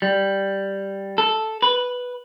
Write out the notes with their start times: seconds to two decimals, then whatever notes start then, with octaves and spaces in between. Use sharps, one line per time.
0.02 G3
1.18 A4
1.62 B4